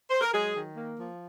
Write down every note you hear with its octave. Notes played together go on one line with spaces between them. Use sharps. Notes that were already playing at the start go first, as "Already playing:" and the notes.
C5
A#4
F#3 G#3 G#4
D#3
A#3
F3